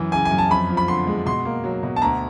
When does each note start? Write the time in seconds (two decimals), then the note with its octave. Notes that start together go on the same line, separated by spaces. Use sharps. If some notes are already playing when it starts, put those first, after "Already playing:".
Already playing: F#2 E3
0.12 C#3 G#5
0.25 G#5
0.31 F#2
0.38 A5
0.50 F2 B5
0.69 F3
0.77 B5
0.88 D3 C6
1.07 G#3
1.26 B2 C6
1.45 A#3
1.64 F#3
1.83 B2
1.96 A5
2.02 D2 A#5